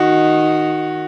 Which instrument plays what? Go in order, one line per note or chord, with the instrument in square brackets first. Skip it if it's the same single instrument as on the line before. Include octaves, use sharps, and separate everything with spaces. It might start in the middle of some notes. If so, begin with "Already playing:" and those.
Already playing: [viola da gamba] D#3 D#4 [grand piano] F#4